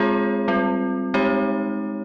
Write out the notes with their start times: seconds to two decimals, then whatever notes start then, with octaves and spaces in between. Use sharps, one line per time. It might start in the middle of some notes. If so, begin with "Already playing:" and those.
Already playing: G#3 C4 F4 G#4 C#5
0.48 G3 C4 F4
1.14 G#3 C4 D#4 G4 C#5